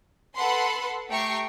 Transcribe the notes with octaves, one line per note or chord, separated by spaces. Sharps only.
A4 B4 F#5 B5 C6
A3 G4 G5 A#5 C#6 C7